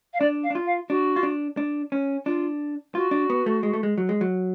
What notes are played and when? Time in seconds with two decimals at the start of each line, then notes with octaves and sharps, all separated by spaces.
0.13 F5
0.20 D4 D5
0.43 F5
0.50 D4
0.55 F4
0.66 F5
0.89 D4 F#4
1.16 F4
1.23 D4
1.57 D4
1.92 C#4
2.26 D4 F4
2.95 F4 F#4
3.11 D4
3.30 B3
3.46 A3
3.63 G#3
3.73 A3
3.83 G#3
3.98 F#3
4.09 G#3
4.21 F#3